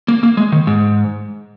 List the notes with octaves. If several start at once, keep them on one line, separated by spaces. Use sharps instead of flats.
A#3
A#3
G#3
D#3
G#2